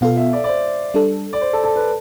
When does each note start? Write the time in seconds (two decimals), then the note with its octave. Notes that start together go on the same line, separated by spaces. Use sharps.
0.01 B2 B3 F4 A4 F5
0.17 E5
0.33 D5
0.44 D5
0.48 C5
0.94 G3 D4 A4
1.33 D5
1.41 C5
1.53 A4
1.64 A4
1.76 B4